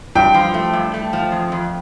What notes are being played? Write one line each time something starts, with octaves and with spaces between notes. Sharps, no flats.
G2 G5
F3
A3
G2
A3
F3
F2
F2